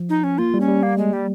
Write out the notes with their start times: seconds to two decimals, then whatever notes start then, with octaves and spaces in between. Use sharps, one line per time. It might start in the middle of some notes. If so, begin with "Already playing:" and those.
Already playing: F3
0.09 D#4
0.24 C#4
0.38 A#3 F4
0.54 G3
0.61 C#4
0.68 G3
0.83 A#3
0.98 G#3
1.13 G3